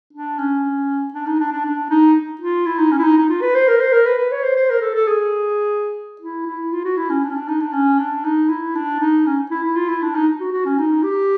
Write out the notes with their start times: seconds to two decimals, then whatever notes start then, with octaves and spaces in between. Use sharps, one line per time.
0.13 D4
0.39 C#4
1.13 D4
1.26 D#4
1.39 D4
1.52 D4
1.65 D4
1.90 D#4
2.41 F4
2.66 E4
2.78 D#4
2.91 C#4
2.99 E4
3.04 D#4
3.17 D#4
3.29 F4
3.42 B4
3.55 C5
3.68 A#4
3.80 C5
3.93 A#4
4.06 B4
4.18 B4
4.32 C#5
4.43 C5
4.56 C5
4.70 A#4
4.81 A4
4.94 A4
5.08 G#4
6.21 E4
6.47 E4
6.73 F4
6.85 F#4
6.97 E4
7.10 C#4
7.23 D4
7.30 C#4
7.36 D4
7.48 D#4
7.60 D4
7.73 C#4
7.99 D4
8.24 D#4
8.49 E4
8.75 D4
9.00 D#4
9.26 C#4
9.51 E4
9.63 E4
9.76 F4
9.89 E4
10.02 D4
10.15 D#4
10.40 F#4
10.52 F#4
10.65 C#4
10.78 D#4
11.03 G4